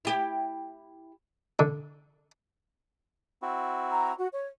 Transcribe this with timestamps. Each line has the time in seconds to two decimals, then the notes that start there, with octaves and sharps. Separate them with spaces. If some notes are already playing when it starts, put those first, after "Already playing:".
0.05 E4 G4
1.59 D3
3.42 C4 E4 F#4
3.91 A#5
4.18 F#4
4.32 C#5